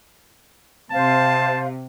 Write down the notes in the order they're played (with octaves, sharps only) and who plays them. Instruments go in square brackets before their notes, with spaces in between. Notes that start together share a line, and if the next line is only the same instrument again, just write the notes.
[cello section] C3 [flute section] C5 F5 [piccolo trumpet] A5